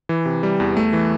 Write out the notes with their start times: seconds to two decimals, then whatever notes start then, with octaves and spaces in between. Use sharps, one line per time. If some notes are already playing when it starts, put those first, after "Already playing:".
0.09 E3
0.26 C3
0.43 G3
0.60 E2
0.77 A3
0.93 E3